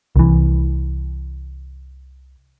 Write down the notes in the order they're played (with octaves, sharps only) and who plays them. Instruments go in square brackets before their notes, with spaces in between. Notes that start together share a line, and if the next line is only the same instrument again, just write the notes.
[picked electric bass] C2 E3